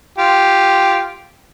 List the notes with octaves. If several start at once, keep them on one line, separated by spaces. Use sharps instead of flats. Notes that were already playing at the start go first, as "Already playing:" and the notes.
F4 G4